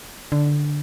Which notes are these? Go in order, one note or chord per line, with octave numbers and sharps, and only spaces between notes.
D3